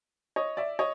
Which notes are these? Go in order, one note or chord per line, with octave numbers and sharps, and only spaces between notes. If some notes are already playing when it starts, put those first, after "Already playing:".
C#5 D#5
D5 E5
C#5 D#5